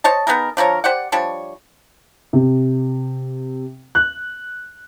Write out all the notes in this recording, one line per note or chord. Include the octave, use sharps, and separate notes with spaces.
C5 C#5 D#5 A5
B3 D#4 G#4 A#4
D3 F3 A#4 C#5
G4 C5 D5 F#5
F3 G3 D4 C#5
C3
F#6